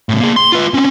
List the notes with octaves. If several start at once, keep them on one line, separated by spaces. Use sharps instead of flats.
A2 C#3
A#3 G#4
C6
F4 B4
C4 C#4